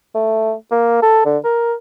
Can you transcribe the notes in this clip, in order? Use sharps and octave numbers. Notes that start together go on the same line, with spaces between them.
A3
A#3
A4
D3
A#4